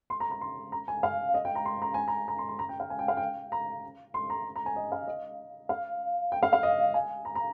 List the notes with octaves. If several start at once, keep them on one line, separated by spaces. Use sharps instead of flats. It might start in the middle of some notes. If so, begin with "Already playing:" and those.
C6
A#5
A#5
C6
A#5
G#5
F5
D#5
G5
A#5
C6
A#5
G#5
A#5
A#5
C6
C6
A#5
G5
F5
G#5
G5
F5
G5
A#5
C6
A#5
A#5
G#5
D#5
F5
D#5
F5
G5
F5
F5
D#5
G#5
A#5
A#5